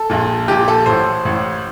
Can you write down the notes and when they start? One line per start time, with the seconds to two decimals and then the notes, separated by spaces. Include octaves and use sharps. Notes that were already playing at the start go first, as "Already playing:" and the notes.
Already playing: A4
0.09 A#1 A#2
0.48 A#1 A#2 G4
0.68 A4
0.86 A1 A2 C5
1.25 A1 A2